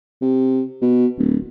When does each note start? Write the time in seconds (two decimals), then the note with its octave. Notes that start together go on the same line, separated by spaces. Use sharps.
0.22 C3
0.81 B2
1.19 D1